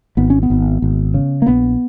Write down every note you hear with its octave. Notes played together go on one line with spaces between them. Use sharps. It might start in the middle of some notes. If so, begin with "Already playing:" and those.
G#1 B3
C#4
B3
G#1
G#1
C#3
A#3
A#1 B3